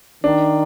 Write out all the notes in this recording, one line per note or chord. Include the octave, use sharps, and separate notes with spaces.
D#3 D4